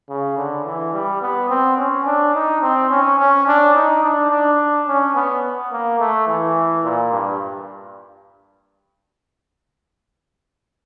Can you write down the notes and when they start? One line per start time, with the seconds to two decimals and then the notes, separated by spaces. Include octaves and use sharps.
0.09 C#3
0.37 D3
0.65 E3
0.93 G3
1.22 B3
1.49 C4
1.78 C#4
2.06 D4
2.34 D#4
2.62 C4
2.91 C#4
3.19 C#4
3.47 D4
3.75 D#4
4.03 D4
4.31 D4
4.87 C#4
5.15 B3
5.72 A#3
6.00 A3
6.27 E3
6.84 A#2
7.12 G2